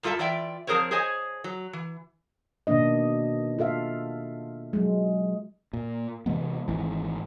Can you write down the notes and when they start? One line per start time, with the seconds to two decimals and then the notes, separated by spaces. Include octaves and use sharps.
0.03 F#2 G3 F4 A4 E5 A5
0.19 E3 F4 D5 E5 G5
0.67 F3 C4 G#4 A#4 C5 C#5
0.91 G#4 C5 C#5 D#5 G#5
1.44 F#3
1.73 E3
2.67 B2 D#3 A#3 D4 D#5
3.59 F4 A4 E5 F5
4.73 F#3 G#3
5.73 A#2
6.26 C3 E3 G#3 B3
6.68 G#1 E3